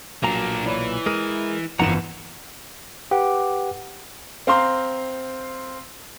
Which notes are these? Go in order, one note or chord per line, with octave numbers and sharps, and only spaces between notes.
B1 A#2 F#3 A#3 D4 A#5
E3 C#5 D5 B5
G#3 G#4 A#4 D#7
G1 F2 E3 F3 F#5 A#5 E7
G4 B4 F#5 D6
C4 F5 A#5 C6